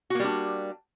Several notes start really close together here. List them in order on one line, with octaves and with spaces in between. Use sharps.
F#4 A#3 G3 D4